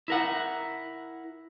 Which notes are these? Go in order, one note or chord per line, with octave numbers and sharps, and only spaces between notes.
E4 A#4 F#5